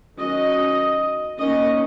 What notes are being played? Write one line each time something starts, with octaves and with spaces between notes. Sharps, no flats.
D#3 F#3 C#4 D#5
D#3 A#3 C#4 D#5